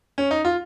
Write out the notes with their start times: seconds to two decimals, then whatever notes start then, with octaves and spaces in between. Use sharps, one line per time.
0.18 C#4
0.31 D#4
0.45 F4